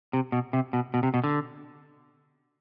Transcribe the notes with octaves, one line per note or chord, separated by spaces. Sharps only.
C3
B2
C3
B2
B2
C3
B2
D3